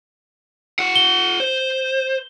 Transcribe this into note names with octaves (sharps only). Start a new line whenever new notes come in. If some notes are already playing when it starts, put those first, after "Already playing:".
F4 F#5
G7
C5